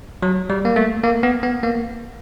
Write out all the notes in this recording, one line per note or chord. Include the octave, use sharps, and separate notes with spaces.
F#3
G3
A#3
A3
A#3
B3
B3
A#3